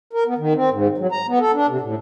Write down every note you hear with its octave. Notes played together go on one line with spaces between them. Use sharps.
A#4
B3
D#3
C4
G#2
F#3
A#5
B3
A4
D4
C3
A2